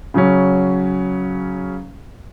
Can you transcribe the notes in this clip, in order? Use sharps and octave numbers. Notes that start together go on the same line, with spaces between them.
C#3 F#3 C#4